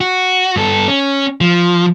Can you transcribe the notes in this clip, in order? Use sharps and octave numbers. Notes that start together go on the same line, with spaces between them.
F#4
G2 A4
C#4
F3